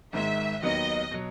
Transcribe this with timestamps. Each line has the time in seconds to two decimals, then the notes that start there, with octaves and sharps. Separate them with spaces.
0.13 G#1 G#2 D#3 G#3 E5
0.62 D#2 D#3 F#3 B3 D#4 D#5
1.11 B2 F#3